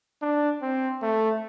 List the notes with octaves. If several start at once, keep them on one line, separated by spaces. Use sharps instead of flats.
D4
C4
A3